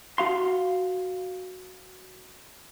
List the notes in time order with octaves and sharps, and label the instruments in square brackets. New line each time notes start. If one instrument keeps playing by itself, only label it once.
[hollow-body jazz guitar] F#4 F5 C6